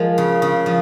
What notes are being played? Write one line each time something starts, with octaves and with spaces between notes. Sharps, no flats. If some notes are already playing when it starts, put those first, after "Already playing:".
Already playing: F3 G#3 A#4
C#3
C#3
F3